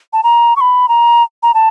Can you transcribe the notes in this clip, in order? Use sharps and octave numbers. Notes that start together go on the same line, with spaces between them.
A5
A#5
C#6
B5
A#5
A#5
A5